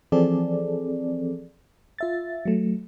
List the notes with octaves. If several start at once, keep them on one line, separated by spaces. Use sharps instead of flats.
E3 F3 C4 G#4 A4 D5
F4 E5 A6
F#3 A3